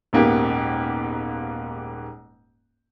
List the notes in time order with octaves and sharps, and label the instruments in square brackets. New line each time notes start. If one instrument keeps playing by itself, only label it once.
[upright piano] D#1 G#2 A#3 B3 G4